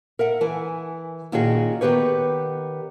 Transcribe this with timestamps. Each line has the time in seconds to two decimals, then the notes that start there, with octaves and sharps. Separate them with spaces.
0.19 A#4 E5 F#5
0.41 E3 G#5
1.32 A#2 D#3 C#4 F#4 G#4
1.81 D#3 B3 G4 B4 C#5